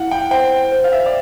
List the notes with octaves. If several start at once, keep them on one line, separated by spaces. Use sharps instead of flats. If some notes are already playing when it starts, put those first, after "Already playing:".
Already playing: E4 F5 F#5
G5
C5 G5
C5
F5
E5
D5